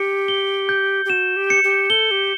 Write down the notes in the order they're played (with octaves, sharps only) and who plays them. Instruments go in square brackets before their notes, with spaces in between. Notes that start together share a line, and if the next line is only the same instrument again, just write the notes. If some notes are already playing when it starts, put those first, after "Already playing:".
Already playing: [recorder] G4 [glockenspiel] C#7
[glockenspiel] G7
G6
[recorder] G4
[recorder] F#4 [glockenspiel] E7
[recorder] G4
[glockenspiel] C#7
[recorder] G4
[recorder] A4 [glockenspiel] G7
[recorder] G4